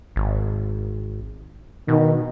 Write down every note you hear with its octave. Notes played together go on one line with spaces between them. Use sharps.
G#1
B2 D#3